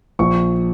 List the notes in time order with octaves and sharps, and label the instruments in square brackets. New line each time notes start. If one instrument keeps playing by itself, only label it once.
[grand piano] A#1 C#6